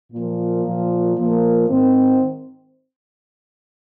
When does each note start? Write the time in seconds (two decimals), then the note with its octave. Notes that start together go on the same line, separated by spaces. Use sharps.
0.12 A#2 F3 A#3
0.65 A#2 F3
1.16 A#2 F3 A#3
1.68 G#2 D#3 C4